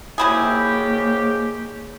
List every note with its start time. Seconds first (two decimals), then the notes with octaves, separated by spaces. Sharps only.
0.18 G#2 C#3 F#3 A#3 E4 G4 G#4